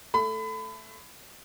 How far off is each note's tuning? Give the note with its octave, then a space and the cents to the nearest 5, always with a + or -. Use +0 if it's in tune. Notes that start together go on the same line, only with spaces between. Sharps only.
A3 +0 B5 +30